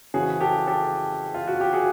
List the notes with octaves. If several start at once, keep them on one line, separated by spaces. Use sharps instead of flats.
F2 C#3 E3 F#4 G#4
G4 A4
G4 A4
F4
F#4
G4
F#4 G#4